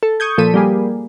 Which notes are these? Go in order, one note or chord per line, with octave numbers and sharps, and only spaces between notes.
A4
C#6 D#6 G6 G#6
A#2 F3 A4 B6 D#7
G3 A#3 G#4